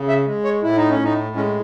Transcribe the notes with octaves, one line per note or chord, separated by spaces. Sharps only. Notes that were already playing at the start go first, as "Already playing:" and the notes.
Already playing: C#3
E5
G#3
C#5
A2 E4
D#4
C#4
A2
D#4
G#3 C#4